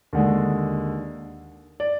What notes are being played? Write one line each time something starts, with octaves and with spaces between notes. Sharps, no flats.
D#2 D3 G#3
D5